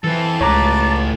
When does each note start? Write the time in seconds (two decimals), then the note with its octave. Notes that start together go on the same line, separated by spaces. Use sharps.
0.04 E3 C4 A4 A5
0.41 C#2 A2 B4 C#5 A#5 D6